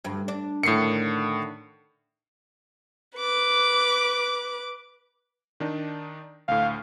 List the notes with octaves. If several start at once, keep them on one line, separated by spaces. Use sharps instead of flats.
D2 G2
D4
A2 D3 D#3 C7 C#7
B4 D6
D#3 D4 D#4
D2 A2 F5